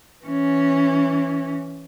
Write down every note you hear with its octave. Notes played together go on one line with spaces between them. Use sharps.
E3 C#4